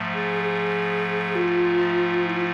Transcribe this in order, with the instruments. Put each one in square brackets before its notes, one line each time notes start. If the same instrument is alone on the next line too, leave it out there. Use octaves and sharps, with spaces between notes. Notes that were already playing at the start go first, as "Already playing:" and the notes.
Already playing: [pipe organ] G#2 F3 A3
[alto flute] G#4
G#4
F4
E4
F4